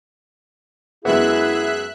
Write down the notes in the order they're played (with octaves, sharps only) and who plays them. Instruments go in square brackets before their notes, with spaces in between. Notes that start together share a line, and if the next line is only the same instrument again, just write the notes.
[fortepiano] F#2 G#3 B3 [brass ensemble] E4 [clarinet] G#4 [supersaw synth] E5 F#6